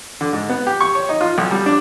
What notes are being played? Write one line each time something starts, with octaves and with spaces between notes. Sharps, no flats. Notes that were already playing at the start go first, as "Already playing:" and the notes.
D3
G#2
B3
G4
C#6
C#5
D#4
F4
B1
G3
D4